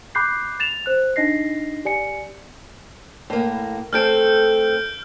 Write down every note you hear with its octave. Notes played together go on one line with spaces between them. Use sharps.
B5 D6 F#6 G6 C7
A6 E7 F7
C5 F#6
D4 D#4 D#5 A#6 C7
G4 D5 G#5 C#7
A2 A#3
A3 C4 A4 F6 G6 D7